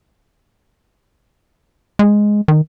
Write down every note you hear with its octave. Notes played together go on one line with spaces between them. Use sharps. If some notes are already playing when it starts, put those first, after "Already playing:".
G#3
D#3